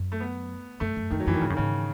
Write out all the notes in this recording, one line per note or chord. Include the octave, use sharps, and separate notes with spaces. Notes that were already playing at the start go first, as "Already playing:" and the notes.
Already playing: F#2
A3
B3
F#2 A3
F#2
F#2 D#3
F#3
F#2 E3
D#3
G#2 C#3
F#2 D#3
G#2 C#3